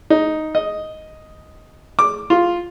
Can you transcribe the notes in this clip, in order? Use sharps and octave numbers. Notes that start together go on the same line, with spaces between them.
D#4
D#5
D6
F4